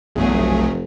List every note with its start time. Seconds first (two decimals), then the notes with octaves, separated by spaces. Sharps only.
0.16 B1 E2 G2 F#3 A3 G#4
0.33 F1